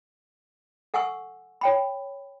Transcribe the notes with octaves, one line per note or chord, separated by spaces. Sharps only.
A4 F#5 G#5 C#6 E6
C#5 G5 B5